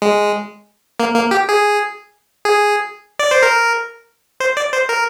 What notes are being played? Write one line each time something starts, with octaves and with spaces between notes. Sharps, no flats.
G#3
A#3
A#3
G4
G#4
G#4
D5
C5
A#4
C5
D5
C5
A#4